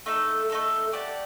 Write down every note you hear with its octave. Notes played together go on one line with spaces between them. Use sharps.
A3 D#4 A4
A3 D#4 A4
G4 D5 F#5 A5